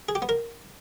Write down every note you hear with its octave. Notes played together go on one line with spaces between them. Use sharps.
G#4
G4
B3
A#4